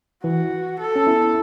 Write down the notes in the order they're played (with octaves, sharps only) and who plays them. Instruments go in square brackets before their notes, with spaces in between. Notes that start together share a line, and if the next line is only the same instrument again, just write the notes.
[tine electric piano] E3 [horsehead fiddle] F#4
[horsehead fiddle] A4
[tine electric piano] C#4
B3 E4